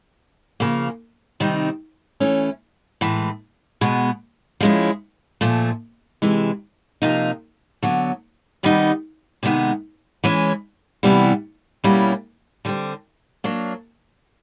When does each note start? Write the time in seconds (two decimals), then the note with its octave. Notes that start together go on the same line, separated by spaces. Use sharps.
0.60 C#3 F3 A#3
1.40 C3 D#3 G3 C4 D#4
2.20 E3 A3 C#4
3.01 A2 E3 G#3
3.81 B2 G#3 B3
4.60 F3 G#3 C#4 E4
5.41 A#2 F3 A3
6.22 C3 E3 G#3
7.02 C3 F3 A#3 D#4
7.83 D3 F#3 B3
8.63 C3 D#3 G3 B3 D#4
9.43 C3 D#3 G#3 B3
10.24 E3 G#3 C#4
11.03 C3 E3 G3 B3 E4
11.84 B2 G3 A#3 C#4 E4
12.65 D3 G3 C4
13.44 F#3 A#3 D4